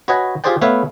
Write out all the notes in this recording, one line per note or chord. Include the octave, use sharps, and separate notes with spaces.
F#4 B4 C#5 D#5 F#5 G#5
F4 G4 G#4 C5 D5 G5
A3 B3 B4 C#5 E5 F5